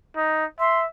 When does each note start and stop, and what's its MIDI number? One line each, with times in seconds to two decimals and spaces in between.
0.16 0.45 63
0.60 0.86 76
0.60 0.80 84